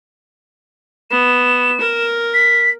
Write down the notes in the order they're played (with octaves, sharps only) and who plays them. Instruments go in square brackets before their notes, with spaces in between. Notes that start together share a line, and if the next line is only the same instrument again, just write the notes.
[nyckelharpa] B3 [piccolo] E7
[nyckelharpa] A#4
[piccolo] B6